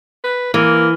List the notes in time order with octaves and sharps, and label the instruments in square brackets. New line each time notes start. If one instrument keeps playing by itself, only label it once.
[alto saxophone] B4
[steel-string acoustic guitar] E3 [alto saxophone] A#3